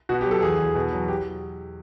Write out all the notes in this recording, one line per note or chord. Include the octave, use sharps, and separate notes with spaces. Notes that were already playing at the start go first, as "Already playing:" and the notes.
B2 F#4
G4
F#3 A4
E2 G#4
E2
B2
F#3
G4